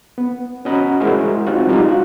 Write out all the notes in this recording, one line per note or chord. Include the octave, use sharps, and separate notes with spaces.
B3
C#4 F#4 D#5 F#5 A#5 B5
G#3 E4 F#4 A#4 C5 C#5
C4 D#4 F4 F#4
G3 G#3 D4 D#4 F4 G4
F#4